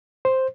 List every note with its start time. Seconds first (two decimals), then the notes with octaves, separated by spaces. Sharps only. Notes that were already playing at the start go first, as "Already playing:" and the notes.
0.25 C5